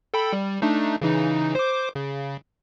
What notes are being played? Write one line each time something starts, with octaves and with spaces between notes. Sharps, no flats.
A4 G5 B5
G3
A3 D4 D#4
C#3 E3 D#4
C5 D6
C#3